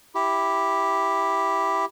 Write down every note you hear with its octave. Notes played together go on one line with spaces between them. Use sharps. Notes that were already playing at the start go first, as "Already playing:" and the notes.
E4 G4